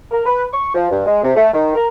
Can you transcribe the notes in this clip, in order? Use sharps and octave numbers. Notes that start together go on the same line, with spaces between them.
A#4
B4
C#6
F3
G2
G#3
C3
A3
D#3
A#4